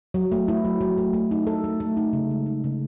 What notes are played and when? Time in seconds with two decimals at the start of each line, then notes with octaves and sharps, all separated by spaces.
0.14 F#3
0.32 A3
0.48 E4
0.65 F#3
0.81 F#3
0.98 A3
1.13 A3
1.31 D#4
1.47 A4
1.64 A3
1.80 A3
1.97 D#4
2.13 C#3
2.31 G#3
2.46 D#4
2.64 C#3